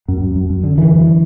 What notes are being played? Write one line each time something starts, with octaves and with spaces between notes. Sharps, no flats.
F#2
F#2
F#2
F#2
D3
D3 E3
F#2